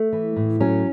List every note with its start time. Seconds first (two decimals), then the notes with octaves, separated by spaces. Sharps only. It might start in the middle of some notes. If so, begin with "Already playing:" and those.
Already playing: A3
0.13 E3
0.36 A2
0.60 F#3 C#4